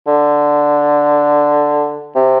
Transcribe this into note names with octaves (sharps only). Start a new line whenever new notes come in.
D3
C3